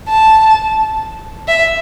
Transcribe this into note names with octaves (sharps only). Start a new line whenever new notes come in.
A5
E5